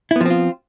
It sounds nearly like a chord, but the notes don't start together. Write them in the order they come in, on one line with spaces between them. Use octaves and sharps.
E4 B3 F3 C4 F4